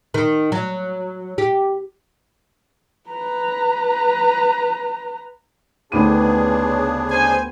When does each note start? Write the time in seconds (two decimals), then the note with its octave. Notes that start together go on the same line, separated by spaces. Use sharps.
0.14 D#3
0.52 F#3
1.38 G4
3.10 B4 A#5
5.92 D2 C#3 B3 D4 D#4 G4 G#4 D#7
7.10 C5 G#5